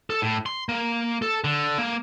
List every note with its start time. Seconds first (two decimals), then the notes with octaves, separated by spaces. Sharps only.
0.10 A4
0.22 A2
0.46 C6
0.69 A#3
1.22 A4
1.44 D3
1.78 A#3